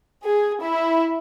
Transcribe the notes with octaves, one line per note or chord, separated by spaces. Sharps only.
G#4
E4